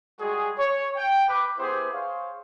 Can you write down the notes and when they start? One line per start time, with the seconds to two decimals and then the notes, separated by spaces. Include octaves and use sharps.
0.19 G3 G#3 F#4 G#4
0.58 C#5
0.97 G5
1.28 B4 D6
1.58 B3 E4 G4 G#4 B4 C5
1.92 G#4 C5 C#5 F5